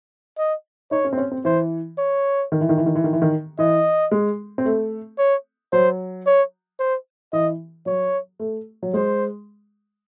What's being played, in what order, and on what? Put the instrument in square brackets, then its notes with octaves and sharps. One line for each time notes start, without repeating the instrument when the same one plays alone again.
[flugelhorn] D#5
[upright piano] D#4 [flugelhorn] C#5
[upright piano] C#4
C4
C#4
C4
[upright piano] E3 [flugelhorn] C5
[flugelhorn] C#5
[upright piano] D#3
E3
D#3
E3
D#3
E3
D#3
E3
D#3
[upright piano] E3 [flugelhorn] D#5
[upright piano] G#3
C4
A3
[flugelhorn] C#5
[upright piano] F#3 [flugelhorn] C5
[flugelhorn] C#5
C5
[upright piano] E3 [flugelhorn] D#5
[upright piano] F#3 [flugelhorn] C#5
[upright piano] A3
F#3
[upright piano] G#3 [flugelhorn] C5